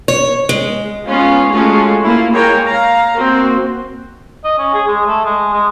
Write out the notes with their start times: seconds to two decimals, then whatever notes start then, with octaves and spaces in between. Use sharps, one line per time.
0.08 C#5
0.49 G#3
1.05 G#3 B3 C#4 F4
1.50 G#3 A3 C#4 F4 F#4
2.02 A#3 E4 F4
2.33 G#3 A#3 A#4 C#5 G5
2.66 F5 A#5
3.14 A#3 C4 F#4
4.44 D#5
4.59 C#4
4.74 G#4
4.88 G#3
5.07 A3
5.25 G#3
5.54 G#3